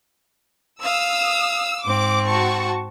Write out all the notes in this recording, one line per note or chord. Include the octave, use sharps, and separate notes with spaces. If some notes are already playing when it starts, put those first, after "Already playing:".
F5 D#6 E6
G#2 C4 D6
F#4 A5 C#6